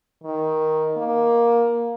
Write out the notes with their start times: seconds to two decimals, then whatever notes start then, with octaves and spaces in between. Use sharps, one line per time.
0.24 D#3
0.97 A#3